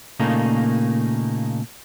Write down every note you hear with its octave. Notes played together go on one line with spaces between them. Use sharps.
A#2 C#3 A3 A#3 D#4